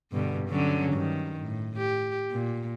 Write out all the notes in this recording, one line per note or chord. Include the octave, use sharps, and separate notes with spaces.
G2 B2 D3
D3 F#3 C#4
G2 D#3
A2
G4
A#2